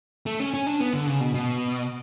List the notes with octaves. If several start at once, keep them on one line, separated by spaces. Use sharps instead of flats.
A3
C#4
C#4
D4
B3
D3
C#3
B2
B2